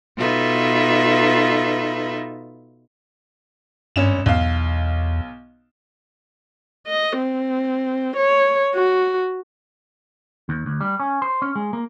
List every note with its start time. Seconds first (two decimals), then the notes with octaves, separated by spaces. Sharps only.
0.16 B2 D#4 F4 A4 B4 E5
3.96 G#1 G2 C#4 E7
4.26 B1 E2 F5
6.88 D#5
7.19 C4
8.17 C#5
8.75 F#4
10.49 D#2
10.66 D2
10.81 G3
11.00 C#4
11.22 C5
11.42 C#4
11.56 G#3
11.73 A#3